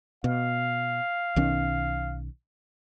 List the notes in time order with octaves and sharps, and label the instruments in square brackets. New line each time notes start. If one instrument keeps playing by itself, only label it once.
[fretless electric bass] B2 [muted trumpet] F5
[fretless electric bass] B1 D#3 C#4